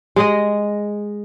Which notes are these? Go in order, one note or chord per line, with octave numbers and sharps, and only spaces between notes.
G#3 G#4 D#5